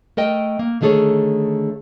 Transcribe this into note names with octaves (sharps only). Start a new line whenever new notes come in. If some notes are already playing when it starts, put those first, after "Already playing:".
A3 A#4 D#5 G5
A#3
D3 D#3 A3 G#4 A4 C#5